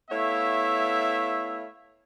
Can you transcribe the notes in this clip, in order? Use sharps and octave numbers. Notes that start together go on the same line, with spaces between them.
A3 B3 E4 C#5 E5 F5